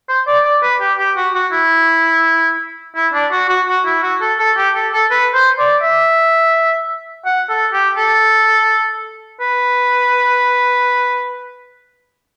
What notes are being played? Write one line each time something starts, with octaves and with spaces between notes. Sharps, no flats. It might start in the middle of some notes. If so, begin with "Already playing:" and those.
C5
D5
D5
B4
G4
G4
F#4
F#4
E4
E4
D4
F#4
F#4
F#4
E4
F#4
A4
A4
G4
A4
A4
B4
C5
D5
E5
F#5
A4
G4
A4
B4